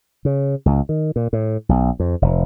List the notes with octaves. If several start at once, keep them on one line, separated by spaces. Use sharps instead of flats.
C#3
C#2
D#3
A#2
A2
B1
F2
F1